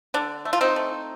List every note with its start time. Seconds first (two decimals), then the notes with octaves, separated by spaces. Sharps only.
0.14 D3 D4
0.45 A3
0.53 F4
0.61 C4 D#4
0.76 A3